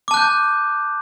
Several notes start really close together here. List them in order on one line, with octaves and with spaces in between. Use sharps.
D6 A5 F#6 G6